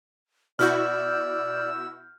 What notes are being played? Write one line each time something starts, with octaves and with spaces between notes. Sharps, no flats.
B2 E4 F#4 D5 E6 F6 G6